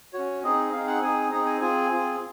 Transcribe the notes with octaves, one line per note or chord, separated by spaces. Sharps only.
C#4 F#4 C#5
C4 D#4 G#4 D#5
C4 D#4 G#4 F5
F#5
C4 D#4 G#4 G#5
C4 D#4 G#4 A#5
G#5
C4 F4 G#4 G#5
C4 F4 G#4